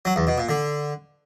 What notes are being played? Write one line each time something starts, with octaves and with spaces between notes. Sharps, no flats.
F#3
E2
B2
A#2
D3